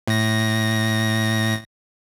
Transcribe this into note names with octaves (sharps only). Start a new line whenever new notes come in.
A2 A#6